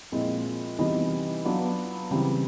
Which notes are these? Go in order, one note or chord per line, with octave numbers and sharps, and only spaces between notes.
A#2 F3 G#3 C4 E4
C3 E3 G3 B3 D#4
F#3 B3 D4 F4
C#3 E3 G3 C4 E4